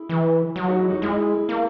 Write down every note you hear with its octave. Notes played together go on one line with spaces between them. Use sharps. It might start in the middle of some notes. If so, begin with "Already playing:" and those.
Already playing: E4 G#4
E3
F#3
D#4 F#4
E4 G#4
D#4 F#4
G#3 E4 G#4
A#3